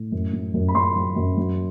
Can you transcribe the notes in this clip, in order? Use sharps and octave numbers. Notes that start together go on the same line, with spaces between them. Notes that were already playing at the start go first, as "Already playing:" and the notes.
Already playing: A2
F#2
F#3
F#2
B5
F#2 C6
F#3
F#2
F#3